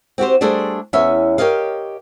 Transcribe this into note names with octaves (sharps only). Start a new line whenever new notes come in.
C4 F#4 G4 C5
G3 A3 D4 G#4 A4 C5
E2 C#4 B4 C#5 E5
G4 G#4 A#4 C#5 D#5 F5